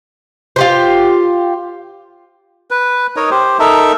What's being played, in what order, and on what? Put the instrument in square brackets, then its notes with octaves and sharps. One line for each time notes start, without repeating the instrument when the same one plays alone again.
[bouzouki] F4 G4 C5
[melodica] B4
D#4 A#4 C#5 D#5
G4 C5
D#4 A4 A#4 E5